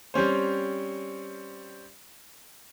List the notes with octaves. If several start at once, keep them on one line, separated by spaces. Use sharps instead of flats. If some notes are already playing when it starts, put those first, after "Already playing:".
G3 C4 C#4 C5